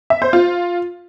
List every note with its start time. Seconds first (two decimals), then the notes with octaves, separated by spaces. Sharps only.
0.10 E5
0.22 C5
0.33 F4